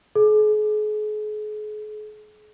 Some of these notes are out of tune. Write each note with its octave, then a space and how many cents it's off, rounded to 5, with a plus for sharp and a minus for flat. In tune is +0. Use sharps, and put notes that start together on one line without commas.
G#4 +40